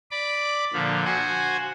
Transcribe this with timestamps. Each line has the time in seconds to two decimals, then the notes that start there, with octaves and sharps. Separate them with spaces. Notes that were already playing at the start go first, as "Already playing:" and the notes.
0.11 D5 B5 D6
0.73 A#2 D3 F3
1.05 F#4 C5 F#5 G#5